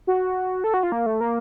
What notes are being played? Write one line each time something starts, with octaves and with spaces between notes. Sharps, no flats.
F#4
A4
F#4
F4
A#3
A3
A#3